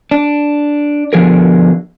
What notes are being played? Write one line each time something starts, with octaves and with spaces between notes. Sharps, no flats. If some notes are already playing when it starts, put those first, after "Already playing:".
D4
B2 D3 F3 G#4 A#4